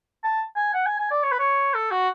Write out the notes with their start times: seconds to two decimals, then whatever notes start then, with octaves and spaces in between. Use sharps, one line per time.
0.24 A5
0.56 G#5
0.74 F#5
0.86 G#5
0.99 G#5
1.11 D5
1.23 C#5
1.32 B4
1.39 C#5
1.74 A4
1.91 F#4